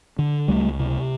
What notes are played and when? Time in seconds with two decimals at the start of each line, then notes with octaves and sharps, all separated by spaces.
0.19 D3
0.48 C#2 G3 A3
0.79 C3